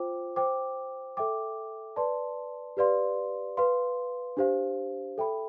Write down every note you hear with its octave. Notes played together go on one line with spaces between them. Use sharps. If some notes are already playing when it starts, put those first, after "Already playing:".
Already playing: F4 C5 G5 D6
C5 G5 D6
A4 E5 G5 D6
B4 D5 A5 C6
G4 B4 D5 F5 C6
B4 F5 C6
D4 G4 C5 F5
A4 E5 G5 B5